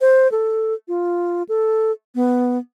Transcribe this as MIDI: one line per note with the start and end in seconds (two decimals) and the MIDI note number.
0.01 0.30 72
0.32 0.74 69
0.88 1.43 65
1.49 1.92 69
2.15 2.58 59